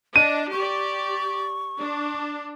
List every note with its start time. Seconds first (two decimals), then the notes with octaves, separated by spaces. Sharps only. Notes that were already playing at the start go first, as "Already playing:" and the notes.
0.16 D4 D#5 D#7
0.52 G4 D5 C#6
1.79 D4